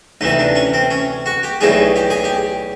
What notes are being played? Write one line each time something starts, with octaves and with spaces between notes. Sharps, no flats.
D2 C3 E3 D#4
D4
C#4
C4
C#4
F#4
G4
B1 A2 E3 G3 G#4
G4
G#4
G4